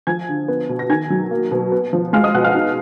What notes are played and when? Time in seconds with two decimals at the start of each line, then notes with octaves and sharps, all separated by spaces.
0.07 F3 G#5 G#6
0.29 D3
0.48 B3
0.69 B2
0.79 A#6
0.89 D#3 G#5 G#6
1.10 F#3
1.31 A#3
1.51 B2
1.72 B3
1.93 F3
2.13 G#3 F5 F6
2.23 D#5 D#6
2.34 B2 F#5 F#6
2.44 F5 F6
2.55 D#4